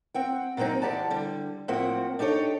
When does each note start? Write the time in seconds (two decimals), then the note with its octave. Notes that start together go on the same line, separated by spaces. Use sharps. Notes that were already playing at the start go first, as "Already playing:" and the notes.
0.14 C4 F#5 G5
0.57 A#2 F#3 A#3 C4 D#4
0.82 E2 G3 G4 D5 F#5 A5
1.10 D3 G3
1.68 A2 F3 A#3 C4 F#5
2.19 D4 D#4 G4 A4 C#5